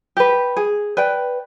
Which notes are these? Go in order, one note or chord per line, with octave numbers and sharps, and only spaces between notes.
G4 B4
G#4
B4 D5 G5